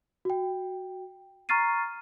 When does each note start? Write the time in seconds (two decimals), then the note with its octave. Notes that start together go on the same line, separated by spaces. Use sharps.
0.25 F#4 G5
1.49 A#5 C#6 F6 A6 C7 D#7